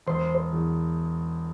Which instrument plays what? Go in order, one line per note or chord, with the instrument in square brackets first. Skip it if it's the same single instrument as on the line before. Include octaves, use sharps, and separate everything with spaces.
[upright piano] E1 [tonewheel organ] C5
[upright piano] E2